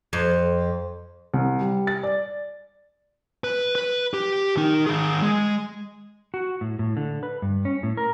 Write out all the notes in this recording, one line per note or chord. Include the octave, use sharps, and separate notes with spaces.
F2
C2
G3
A6
D5
B4
B4
G4
D#3 D#4
D#3 G#4
G#3
F#4
A2
A2
D3
B4
G2
C#4
A2
A#4